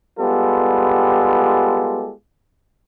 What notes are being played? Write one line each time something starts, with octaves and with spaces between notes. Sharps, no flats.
G3 G#3 B3 F4 G4 A4